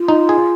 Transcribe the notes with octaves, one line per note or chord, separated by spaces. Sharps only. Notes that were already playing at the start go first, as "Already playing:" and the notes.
Already playing: F4
D#4
G#4